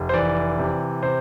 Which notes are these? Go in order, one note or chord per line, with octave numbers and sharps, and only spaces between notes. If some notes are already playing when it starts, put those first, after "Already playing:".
Already playing: F1
C5
E3 D5
C3
C3 C5